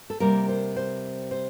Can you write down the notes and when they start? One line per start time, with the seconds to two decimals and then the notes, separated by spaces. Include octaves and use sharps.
0.10 A4
0.20 C3 G3 A#3 A#4
0.49 C5
0.76 C5
1.31 C5